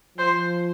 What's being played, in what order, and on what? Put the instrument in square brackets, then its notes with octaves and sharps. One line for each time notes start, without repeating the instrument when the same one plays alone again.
[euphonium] F3 [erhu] C5